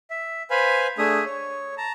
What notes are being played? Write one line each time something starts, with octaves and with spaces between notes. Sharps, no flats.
E5
B4 C5 F5 G#5 B5
A3 D4 G#4 E5 D#6
C#5
A5 A#5